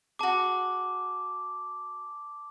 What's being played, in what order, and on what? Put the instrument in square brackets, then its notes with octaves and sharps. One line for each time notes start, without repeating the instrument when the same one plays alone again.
[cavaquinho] F#4 G#4 [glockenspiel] A5 D6